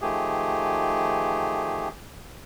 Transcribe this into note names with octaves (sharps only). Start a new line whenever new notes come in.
D#3 F3 A3 G4 G#4